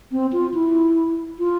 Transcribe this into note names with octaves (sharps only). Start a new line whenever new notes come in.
C4
F4
E4
F4